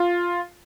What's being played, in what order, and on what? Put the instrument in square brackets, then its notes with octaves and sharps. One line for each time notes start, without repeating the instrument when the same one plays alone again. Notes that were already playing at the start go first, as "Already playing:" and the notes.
Already playing: [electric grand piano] F4